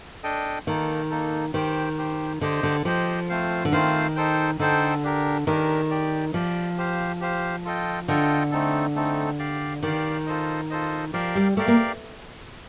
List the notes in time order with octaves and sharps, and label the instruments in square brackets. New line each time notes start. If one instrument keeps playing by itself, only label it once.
[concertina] D4 A4 D#5 G5
[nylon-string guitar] D#3 [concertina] A#3 D#4 A4
[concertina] A#3 D#4 A4
[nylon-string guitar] D#3 [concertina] G4 C5 G5
[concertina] G4 C5 G5
[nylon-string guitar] D3 [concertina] G4 C5 D#5 G5
[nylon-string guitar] D3
[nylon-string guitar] F3 [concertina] G4 C5 D#5 G5
[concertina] A3 C4 F4 C5 F5
[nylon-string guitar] D3
[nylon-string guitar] D#3 [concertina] A3 C4 F4 C5 F5
[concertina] D#4 A4 C5 G5
[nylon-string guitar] D3 [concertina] D#4 A4 C5 G5
[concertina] D4 G4 A#4
[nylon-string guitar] D#3 [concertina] D4 G4 A#4
[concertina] G4 D5 G5
[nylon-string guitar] F3 [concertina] G4 D5 G5
[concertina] G4 C5 F5
G4 C5 F5
F4 A4 D#5 G5
[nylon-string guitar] D3 [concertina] F4 A4 D#5 G5
[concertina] A3 C4 D#4 A4
A3 C4 D#4 A4
G4 D5 F5
[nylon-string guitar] D#3 [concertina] G4 D5 F5
[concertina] F4 A4 C5 D#5
F4 A4 C5 D#5
[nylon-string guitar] F3 [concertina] G4 A#4 D5 F5
[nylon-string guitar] G3
[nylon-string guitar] A3 [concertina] G4 A#4 D5 F5
[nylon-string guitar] A#3